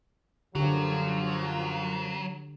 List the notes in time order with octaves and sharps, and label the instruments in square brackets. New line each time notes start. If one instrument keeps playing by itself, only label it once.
[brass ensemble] F#2 F3 [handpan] D3 G4 [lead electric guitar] F#3